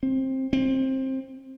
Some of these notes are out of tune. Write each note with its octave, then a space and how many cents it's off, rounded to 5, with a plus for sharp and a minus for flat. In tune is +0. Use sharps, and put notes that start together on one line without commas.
C4 +15
C4 +20